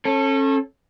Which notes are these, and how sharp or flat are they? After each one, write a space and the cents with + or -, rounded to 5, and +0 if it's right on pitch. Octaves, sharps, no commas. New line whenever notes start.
C#4 -35 A4 +0